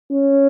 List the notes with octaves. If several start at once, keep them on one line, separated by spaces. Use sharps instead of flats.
C#4